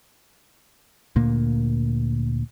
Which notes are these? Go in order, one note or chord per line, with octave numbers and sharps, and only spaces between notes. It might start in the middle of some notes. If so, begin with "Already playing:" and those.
D2 A#2 A#3